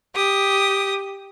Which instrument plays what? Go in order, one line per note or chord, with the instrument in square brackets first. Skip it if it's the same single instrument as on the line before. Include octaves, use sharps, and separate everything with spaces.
[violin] G4 [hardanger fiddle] D#6